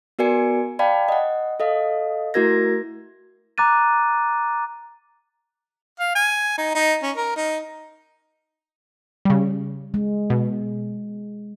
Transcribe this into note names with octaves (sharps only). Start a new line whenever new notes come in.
B3 F#4 A#4 D5 G#5 C#7
D5 F5 G5 A5 B5
D#5 F#5
A4 D#5 F5
A3 E4 F#4 A#4 G#6 A#6
A#5 D6 F#6 A6 D#7
F5
G#5
D#4
D#4
C#4
A#4
D#4
C#3 G3
G#3
B2